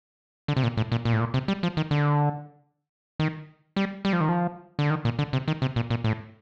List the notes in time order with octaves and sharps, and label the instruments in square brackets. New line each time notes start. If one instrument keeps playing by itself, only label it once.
[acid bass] D3
C3
A#2
A2
A#2
A#2
A2
A#2
C3
G3
F3
D#3
D3
D#3
G3
G3
F3
D#3
F3
D3
D#3
A#2
D3
C3
D#3
C3
A#2
A#2
A2